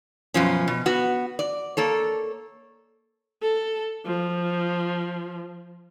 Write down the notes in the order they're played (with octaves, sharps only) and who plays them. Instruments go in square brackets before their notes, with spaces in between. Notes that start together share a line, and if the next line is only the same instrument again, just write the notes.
[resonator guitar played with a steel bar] F#2 B2 F3 C#4
B2
B3 F#4
D5
A#3 A4 C#5
[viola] A4
F3